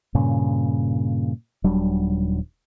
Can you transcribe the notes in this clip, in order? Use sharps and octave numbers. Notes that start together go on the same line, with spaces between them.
G2 A#2 C#3
D#1 F#3 G3 D4